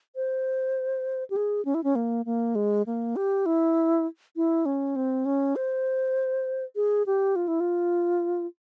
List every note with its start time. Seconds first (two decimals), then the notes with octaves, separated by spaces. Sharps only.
0.16 C5
1.30 G4
1.36 G#4
1.65 C#4
1.74 E4
1.84 C#4
1.95 A#3
2.26 A#3
2.55 G#3
2.86 A#3
3.16 G4
3.46 E4
4.36 E4
4.66 C#4
4.96 C4
5.25 C#4
5.56 C5
6.76 G#4
7.06 G4
7.36 F4
7.48 E4
7.60 F4